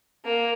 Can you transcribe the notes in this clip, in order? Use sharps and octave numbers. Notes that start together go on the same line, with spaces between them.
A#3